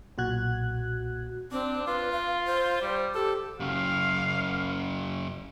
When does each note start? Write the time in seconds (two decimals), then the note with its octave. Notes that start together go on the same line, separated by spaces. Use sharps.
0.18 B1 A#2 F#4 F#6 G#6
1.52 C4 D4
1.87 F4 B4
2.12 F5
2.46 C5
2.81 G3
3.15 G4 A4
3.60 F#2 C#3 F5